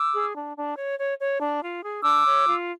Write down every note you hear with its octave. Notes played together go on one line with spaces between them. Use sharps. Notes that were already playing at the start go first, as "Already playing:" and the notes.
Already playing: D6 E6
G#4
D4
D4
C#5
C#5
C#5
D4
F4
G#4
D4 D6 E6
C#5
F4